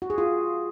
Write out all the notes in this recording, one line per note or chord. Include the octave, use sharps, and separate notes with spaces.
F#4
G#4
F4